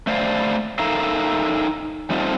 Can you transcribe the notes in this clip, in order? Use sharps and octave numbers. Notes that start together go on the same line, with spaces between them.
A3 C5 D5 F5
D#4 A4 A#4 E5 F5
G3 A3 C4 D#4 F4